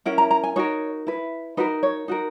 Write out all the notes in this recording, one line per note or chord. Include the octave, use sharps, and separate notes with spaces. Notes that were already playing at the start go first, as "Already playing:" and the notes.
C#4 E4 A#4 F#5
A#5
A#5
G#5
D#4 F#4 A#4 C#5
E4 B4
D#4 F#4 A#4 B4
C#5
D#4 F#4 A#4